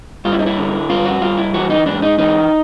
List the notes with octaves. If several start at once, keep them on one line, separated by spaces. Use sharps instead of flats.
G2 F4
E4
D#4
E4
D3
G2 F4
F#4
G2 F4
E4
E3 F#4
D#4
G#2 D4
D#4
E3 D#4